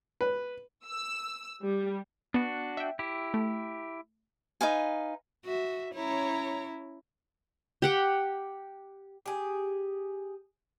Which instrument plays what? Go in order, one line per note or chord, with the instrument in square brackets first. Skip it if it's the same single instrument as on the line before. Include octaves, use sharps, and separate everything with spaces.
[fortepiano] B4
[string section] E6
G3
[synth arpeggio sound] B3 [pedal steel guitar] D4 F#4
[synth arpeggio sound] E5 G5
[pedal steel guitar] E4 G4
[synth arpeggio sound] A3
[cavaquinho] D#4 B4 F5 G#5
[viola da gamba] F#4 [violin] E5
[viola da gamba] C#4 E4 [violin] C#5 A#5
[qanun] G4 F#5 G5
[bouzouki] G4 G#4